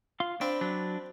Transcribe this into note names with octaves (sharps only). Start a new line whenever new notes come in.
F4 F5 C6
C4 D4 B5
F#3 D4